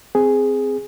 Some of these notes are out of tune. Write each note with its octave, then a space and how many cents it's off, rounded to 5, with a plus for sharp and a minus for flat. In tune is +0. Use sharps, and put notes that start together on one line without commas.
C4 -10 G#4 +0